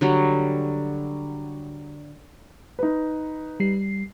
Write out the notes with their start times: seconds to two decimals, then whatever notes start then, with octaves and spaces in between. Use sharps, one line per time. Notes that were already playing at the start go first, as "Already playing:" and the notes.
0.01 D3 F#3 G3
2.79 D#4 B4
3.60 G3 C7